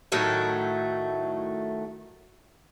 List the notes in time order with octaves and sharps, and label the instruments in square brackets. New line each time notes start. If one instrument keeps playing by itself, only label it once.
[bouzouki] A2 D#3 F#3 A3